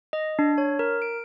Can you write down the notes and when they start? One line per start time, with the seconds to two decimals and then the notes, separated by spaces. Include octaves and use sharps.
0.13 D#5
0.39 D4
0.58 C#5
0.79 A#4
1.02 D7